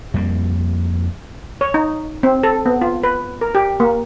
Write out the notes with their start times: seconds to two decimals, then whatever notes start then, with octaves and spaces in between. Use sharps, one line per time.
0.14 F2 G3 A#3
1.61 C#5
1.74 D#4
2.23 C4
2.43 A4
2.66 B3
2.82 F4
3.04 B4
3.41 A#4
3.55 G4
3.80 A#3